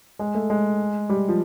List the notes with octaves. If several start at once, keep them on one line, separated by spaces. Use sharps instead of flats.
G#3
A3
G#3
G3
F3